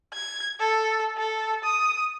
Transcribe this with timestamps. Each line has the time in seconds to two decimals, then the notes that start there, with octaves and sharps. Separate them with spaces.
0.13 G#6
0.60 A4
1.18 A4
1.64 D#6